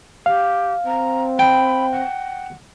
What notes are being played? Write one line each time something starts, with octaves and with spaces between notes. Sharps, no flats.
G4 F5
C4 A#5
G5 B5
F#5